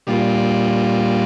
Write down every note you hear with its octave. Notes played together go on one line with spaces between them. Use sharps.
A#2 G3 D4 F4